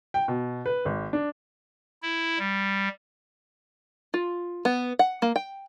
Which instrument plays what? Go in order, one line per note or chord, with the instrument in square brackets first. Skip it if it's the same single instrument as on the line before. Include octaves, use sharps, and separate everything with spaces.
[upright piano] G5
B2
B4
G#1
D4
[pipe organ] E4
G3
[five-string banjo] F4
B3
F#5
A#3
G5